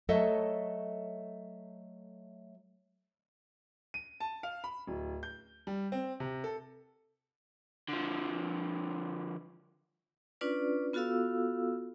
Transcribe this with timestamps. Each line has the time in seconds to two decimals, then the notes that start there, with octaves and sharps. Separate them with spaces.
0.09 F#3 A3 A4 C#5 D#5 E5
3.94 D#7
4.20 A5
4.43 F5
4.64 B5
4.87 D1
5.23 G6
5.67 G3
5.92 C4
6.20 C3
6.44 A4
7.89 D3 F3
10.41 C#4 D4 F4 B4 D5
10.93 B3 F4 F#4 A4 F5 E6